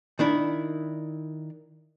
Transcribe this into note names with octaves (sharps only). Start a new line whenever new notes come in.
D#3 D4 E4